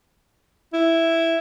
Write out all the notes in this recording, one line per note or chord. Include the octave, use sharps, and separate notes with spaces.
E4